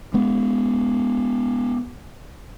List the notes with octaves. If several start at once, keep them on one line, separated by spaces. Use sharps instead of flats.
G#3 B3